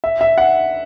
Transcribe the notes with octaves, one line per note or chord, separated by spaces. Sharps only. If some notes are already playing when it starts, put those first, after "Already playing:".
E5
E5
F#5